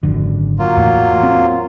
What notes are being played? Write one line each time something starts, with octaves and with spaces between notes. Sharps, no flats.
G#1 F#2 D3
F#3 A#3 F4
E2 A2
C4